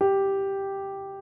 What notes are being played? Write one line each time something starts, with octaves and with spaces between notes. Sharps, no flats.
G4